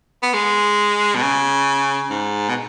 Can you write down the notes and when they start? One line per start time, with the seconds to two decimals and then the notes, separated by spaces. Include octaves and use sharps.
0.23 B3
0.34 G#3
1.15 B2
1.22 C#3
2.10 G#2
2.49 B2